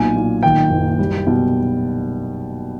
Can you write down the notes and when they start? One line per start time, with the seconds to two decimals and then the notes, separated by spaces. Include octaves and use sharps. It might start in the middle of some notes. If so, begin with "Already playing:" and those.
Already playing: B1 A#2 G#5
0.16 A#2
0.43 D#3 G5
0.70 F#1
0.99 G3
1.27 B2